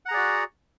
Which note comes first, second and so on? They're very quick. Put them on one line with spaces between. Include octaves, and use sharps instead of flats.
F#5 A#5 G#4 D5 F#4